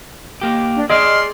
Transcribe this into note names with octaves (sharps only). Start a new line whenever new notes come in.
A#3 G4
D4
G#4 D5 D#5 C6 F6